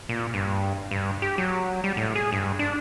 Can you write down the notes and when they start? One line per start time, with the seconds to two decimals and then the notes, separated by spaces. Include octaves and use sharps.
0.09 A#2
0.34 G2
0.91 G2
1.22 G4
1.38 F#3
1.84 G3
1.97 A2
2.15 G#4
2.32 G2
2.59 D4